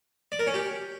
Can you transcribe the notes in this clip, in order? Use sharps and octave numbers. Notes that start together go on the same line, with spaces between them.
D5
A#4
C#4
G4